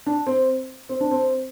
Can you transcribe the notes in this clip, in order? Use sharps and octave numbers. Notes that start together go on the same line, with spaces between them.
D4
C4
C4
D4
C4